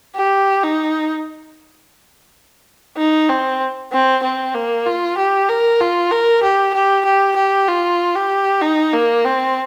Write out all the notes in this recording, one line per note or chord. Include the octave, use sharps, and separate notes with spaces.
G4
D#4
D#4
C4
C4
C4
A#3
F4
G4
A#4
F4
A#4
G4
G4
G4
G4
F4
G4
D#4
A#3
C4